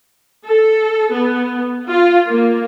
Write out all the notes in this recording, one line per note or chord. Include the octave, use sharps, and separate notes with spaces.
A4
B3
F4
A#3